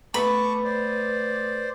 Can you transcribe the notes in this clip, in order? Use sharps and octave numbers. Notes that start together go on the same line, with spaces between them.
A3 B3 B4 A5 B5 C#6 D6
C5 D5